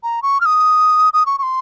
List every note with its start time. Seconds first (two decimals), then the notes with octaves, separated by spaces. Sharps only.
0.03 A#5
0.23 C#6
0.41 F6
0.46 D#6
1.14 D#6
1.26 C#6
1.39 C#6
1.43 C6